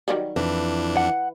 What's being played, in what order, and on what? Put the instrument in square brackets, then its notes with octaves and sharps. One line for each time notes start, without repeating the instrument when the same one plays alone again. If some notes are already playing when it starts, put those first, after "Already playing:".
[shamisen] D#3 F#3 G3
[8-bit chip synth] F2 D4 [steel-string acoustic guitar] E3
[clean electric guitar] F#5